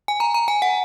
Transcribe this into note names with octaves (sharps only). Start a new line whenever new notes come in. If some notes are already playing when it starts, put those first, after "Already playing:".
G#5
A#5
A#5
G#5
F#5